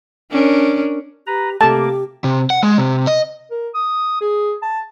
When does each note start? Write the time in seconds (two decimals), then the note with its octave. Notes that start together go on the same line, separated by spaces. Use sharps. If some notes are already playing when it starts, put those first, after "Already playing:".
0.31 C#4 D4 A#4
1.27 G4 B4 A#5
1.61 C3 A3 A#3 G4 A5 D6
2.24 C3
2.50 F#5
2.63 G#3
2.78 C3
3.07 D#5
3.51 A#4
3.74 D#6
4.21 G#4
4.62 A5